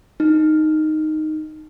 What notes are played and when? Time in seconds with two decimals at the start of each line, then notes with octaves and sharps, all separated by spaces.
0.20 D#4